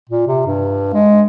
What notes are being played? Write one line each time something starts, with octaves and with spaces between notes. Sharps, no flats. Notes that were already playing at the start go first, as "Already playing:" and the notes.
A#2
C3
G2
G#3